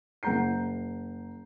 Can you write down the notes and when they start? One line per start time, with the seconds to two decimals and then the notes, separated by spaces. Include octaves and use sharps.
0.23 F#1 F#5 A#5 G6 C7